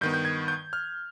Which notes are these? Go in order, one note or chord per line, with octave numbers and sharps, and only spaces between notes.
G2 D#3 B3 G6
G6
G#6
G6
F6